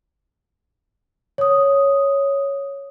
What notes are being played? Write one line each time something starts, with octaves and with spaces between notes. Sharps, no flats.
C#5 D#6